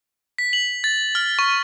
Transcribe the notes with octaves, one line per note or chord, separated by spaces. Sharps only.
B6
F#7
A6
F6
C#6